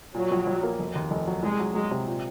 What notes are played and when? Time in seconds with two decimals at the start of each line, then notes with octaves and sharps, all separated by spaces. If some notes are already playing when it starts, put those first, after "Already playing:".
0.15 A#2 F#3
0.31 A#1
0.47 A#1
0.63 A#3
0.79 F1
0.95 D#2
1.11 F1
1.27 F#3
1.42 C2 G#3
1.60 F#3
1.75 F#3 G#3
1.91 C3
2.07 A#2